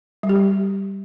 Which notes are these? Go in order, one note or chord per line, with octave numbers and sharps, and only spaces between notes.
G3
G4
G3